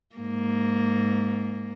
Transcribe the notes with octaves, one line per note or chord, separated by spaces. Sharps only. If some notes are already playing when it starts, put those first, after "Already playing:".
G#2 A#3